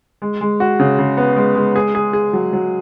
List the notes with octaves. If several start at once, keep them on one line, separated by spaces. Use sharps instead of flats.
G#3
G#3
F#4
C#3
C#3
B3
G#3
G#3
G#4
G#4
G#4
F#3
F#3